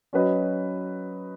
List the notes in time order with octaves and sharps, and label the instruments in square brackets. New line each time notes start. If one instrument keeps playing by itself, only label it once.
[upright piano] F#3 C#4 F#4 B4 D#5